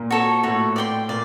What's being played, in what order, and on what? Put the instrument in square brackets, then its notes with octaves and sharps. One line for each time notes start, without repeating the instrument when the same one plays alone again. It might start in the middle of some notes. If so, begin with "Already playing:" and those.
Already playing: [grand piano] A#2 A#3
[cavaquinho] F#4 A4 C#5
[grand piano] A2 A3 [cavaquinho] F#4 A4 C#5
[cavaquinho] D5 G5 C6
[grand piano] A#2 A#3 [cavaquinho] D5